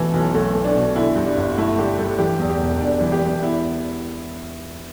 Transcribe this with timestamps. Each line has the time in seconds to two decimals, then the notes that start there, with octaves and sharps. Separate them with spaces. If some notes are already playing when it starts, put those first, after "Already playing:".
Already playing: B2 E3 A3
0.13 B1
0.35 B1 A3
0.55 A3
0.64 D4
0.75 B2
0.96 D3 E4
1.16 G2
1.26 D4
1.37 G1
1.58 A3 E4
1.78 D3 G4
1.98 G2 A4
2.19 E3 G4
2.39 E2
2.50 G4
2.61 E1
2.81 E1 D4
3.01 E3
3.12 G4
3.22 E2
3.42 B3 E4